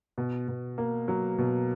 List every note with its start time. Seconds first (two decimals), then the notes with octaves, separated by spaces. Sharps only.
0.18 B2
0.48 B2
0.78 A#3
1.08 F#3
1.38 B2